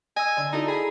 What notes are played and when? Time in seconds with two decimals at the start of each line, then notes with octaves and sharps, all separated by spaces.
0.16 D#5 G#5 E6
0.37 D3
0.53 D#4 E4 F#4 A4
0.68 G#4 G#5 A#5 B5